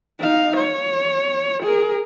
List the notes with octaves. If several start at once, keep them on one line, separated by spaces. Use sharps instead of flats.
D#4 F5
C#5
G#4 A#4